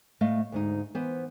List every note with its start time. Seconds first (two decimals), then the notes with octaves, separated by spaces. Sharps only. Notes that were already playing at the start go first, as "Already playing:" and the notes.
0.21 A2 A3 D#5 F5
0.52 D2 G#2 D#4
0.95 E3 B3 C5